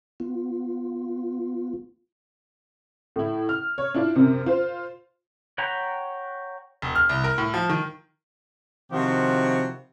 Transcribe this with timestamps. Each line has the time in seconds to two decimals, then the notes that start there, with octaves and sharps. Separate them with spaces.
0.20 B3 F4
3.16 A2 E4
3.49 F6
3.78 C#5
3.94 D4 E4 F4 D5
4.16 F#2 C3
4.46 F4 C5
5.58 C#5 F#5 G5 A#5 B5
6.82 E1
6.95 F6
7.09 C2
7.24 A#4
7.38 A2
7.54 F3
7.70 D#3
8.92 C3 D#3 F3 E4 F#4